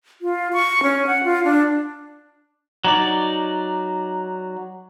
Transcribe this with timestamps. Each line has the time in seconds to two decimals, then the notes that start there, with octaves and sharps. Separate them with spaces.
0.22 F4
0.53 C#6
0.83 C#4
1.07 F#5
1.24 F4
1.44 D4
2.85 F#3 D#4 D5